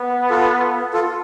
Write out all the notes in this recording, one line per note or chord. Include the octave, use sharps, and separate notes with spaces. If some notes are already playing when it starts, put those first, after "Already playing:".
Already playing: B3
F4 A4
F4 A4